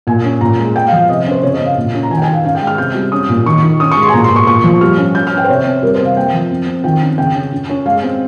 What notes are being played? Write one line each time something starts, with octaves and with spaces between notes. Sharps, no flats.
A#2 G#5
C#4
A#2 A#5
G#3
G#3 G5
F5
F3
F5
C3 D#5
C#4
C5
C#3 C#5
D#5
C#3
F5
A#2
C#4
A#5
D#3 G#5
G5
G#5
D#3
F5
C#4 F5
G5
G#3
F6
C3 G6
G3
C#4 D#6
A#2
D#3 C#6
D#3
C#4 D#6
C#6
G#3
C6
G#5
A#2 A#5
C6
A#2
C#6
A#2 C#6
F3
G3 F6
C#4
C#4 G6
F6
C#4 G5
C5
C3 C#5
C4
G3 A#4
C5
C3
F5
A#3 G5
F3
C4
C4
D#3 G5
C#4
C#3 G5
C#4
C#4
C#4
G#3 F5
C4